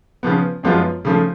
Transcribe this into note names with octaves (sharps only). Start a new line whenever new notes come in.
C#3 F3 B3
F#2 F3 G#3 B3 F4
C#3 F3 A3